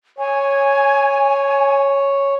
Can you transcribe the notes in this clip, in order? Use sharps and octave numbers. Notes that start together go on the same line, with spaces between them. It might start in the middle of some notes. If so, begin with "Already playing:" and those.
C#5 G#5